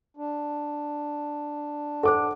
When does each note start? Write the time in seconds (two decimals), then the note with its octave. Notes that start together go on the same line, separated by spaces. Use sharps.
0.17 D4
2.03 A4 C5 F#5 D6